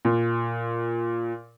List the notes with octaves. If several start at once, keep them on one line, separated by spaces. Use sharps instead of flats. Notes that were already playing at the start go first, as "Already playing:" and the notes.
A#2